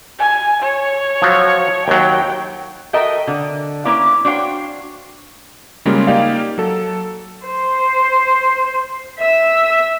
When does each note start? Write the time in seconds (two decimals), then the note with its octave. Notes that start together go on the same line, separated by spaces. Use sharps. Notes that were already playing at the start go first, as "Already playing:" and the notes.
0.19 G#5
0.62 C#5
1.22 F3 F#3
1.88 D#2 F#3 G5
2.93 F#4 A4 A#4 D#5 E5 G5
3.27 D3
3.85 A#3 C#4 E4 B4 D5
4.25 D4 F#4 C5 C#5 F5 G5
5.85 C#3 G3 G#3 A#3 C#4 F4
6.07 A#3 D#4 G4 D5 F5
6.58 F#3 A4
7.46 C5
9.19 E5 E6